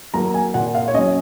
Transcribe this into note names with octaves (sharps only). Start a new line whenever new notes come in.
F#3 A#3 A#5
G#5
A#2 F#5
F5
C#5
F#3 C#4 D#5